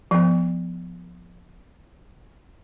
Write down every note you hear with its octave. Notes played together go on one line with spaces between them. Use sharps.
F3 B3